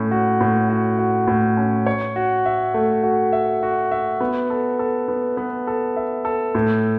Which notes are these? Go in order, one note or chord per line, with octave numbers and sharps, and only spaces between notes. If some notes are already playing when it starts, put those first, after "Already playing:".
Already playing: A2 C#4
F#4
A2
F#4
F#4
A2
C#4
C#5
F#4
E5
A3
F#4
E5
F#4
E5
B3
A4
A4
B3
B3
A4
E5
A4
A2